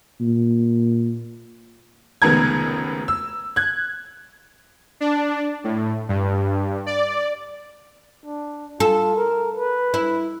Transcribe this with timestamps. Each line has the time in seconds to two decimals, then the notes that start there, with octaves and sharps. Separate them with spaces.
0.20 A#2
2.22 F1 C#2 D#3 B3 A#4 G#6
3.08 E6
3.56 F#6 G#6
5.01 D4
5.64 A2
6.09 G2
6.86 D5
8.26 D4
8.80 F4 A4
9.16 A#4
9.56 B4
9.94 E4